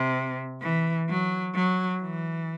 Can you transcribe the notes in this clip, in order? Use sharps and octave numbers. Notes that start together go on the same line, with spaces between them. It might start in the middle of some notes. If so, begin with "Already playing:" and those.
Already playing: C3
E3
F#3
F#3
E3